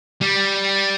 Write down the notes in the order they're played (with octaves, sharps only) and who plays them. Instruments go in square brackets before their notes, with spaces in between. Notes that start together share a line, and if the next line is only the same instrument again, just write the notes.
[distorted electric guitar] G3